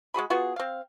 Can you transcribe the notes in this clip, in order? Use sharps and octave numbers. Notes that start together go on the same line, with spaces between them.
G#3 F#4 G#4 B5
B3 F4 F#4 G#4
C4 F5